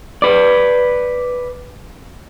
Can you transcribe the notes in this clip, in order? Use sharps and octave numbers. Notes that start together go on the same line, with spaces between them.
B4 D5